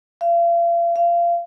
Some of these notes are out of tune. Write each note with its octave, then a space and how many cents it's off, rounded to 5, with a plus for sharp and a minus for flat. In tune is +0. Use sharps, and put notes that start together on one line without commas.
F5 -40
F5 -25